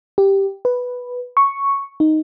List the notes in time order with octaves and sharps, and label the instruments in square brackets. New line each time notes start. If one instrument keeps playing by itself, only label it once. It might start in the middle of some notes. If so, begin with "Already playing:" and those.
[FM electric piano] G4
B4
C#6
D#4